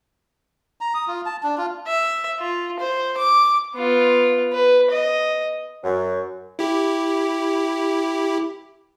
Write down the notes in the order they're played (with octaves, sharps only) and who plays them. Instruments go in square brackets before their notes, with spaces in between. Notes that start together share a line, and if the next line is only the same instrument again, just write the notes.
[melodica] A#5
D#6
F4
A5
D4
F4
[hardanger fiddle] E5
F4
C5
D6
B3 F4
B4
D#5
[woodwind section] F#2
[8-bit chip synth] E4 G4